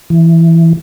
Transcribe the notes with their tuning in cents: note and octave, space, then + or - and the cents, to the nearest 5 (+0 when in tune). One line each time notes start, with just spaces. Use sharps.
E3 +5